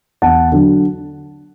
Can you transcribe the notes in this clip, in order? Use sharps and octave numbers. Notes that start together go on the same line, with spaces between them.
E2 F#5 A5
D3 F#3